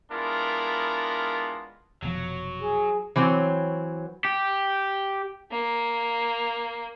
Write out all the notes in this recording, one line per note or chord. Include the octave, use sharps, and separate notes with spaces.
G#3 B3 D4 E4 F4 A#4
F1 B2 F3 F#3
G#4
E3 F#3 C4 C#5
G4
A#3